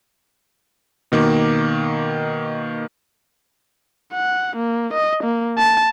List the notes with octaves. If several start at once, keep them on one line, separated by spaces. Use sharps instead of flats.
B2 D#3 A#3 D6
F#5
A#3
D#5
A#3
A5